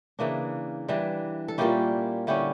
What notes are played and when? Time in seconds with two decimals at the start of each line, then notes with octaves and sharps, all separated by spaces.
0.19 C#3 E3 A#3 D4
0.88 E3 G3 D4
1.48 A4
1.58 A#2 G3 A#3 C#4 E4 G4
2.27 D3 G3 C#4 E4 G4